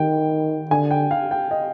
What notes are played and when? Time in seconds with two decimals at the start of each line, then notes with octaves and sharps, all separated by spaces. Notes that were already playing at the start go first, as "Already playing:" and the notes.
Already playing: D#3 G5
0.71 D3 G#5
0.91 G5
1.11 F5
1.31 G5
1.51 D#5